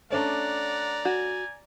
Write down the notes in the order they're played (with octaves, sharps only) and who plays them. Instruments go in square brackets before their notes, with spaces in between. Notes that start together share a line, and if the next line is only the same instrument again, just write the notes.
[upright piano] A3 C#4 D4 [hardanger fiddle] D5 A#5 [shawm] F#5
[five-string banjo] F#4 [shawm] G#5